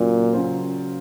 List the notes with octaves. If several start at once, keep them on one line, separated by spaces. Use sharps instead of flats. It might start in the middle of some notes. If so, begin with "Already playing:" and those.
Already playing: A#2 C#3 F#3 C#4
C#3 F#3 C#4 F4 C5